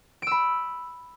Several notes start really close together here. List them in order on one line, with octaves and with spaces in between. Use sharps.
D7 E6 B5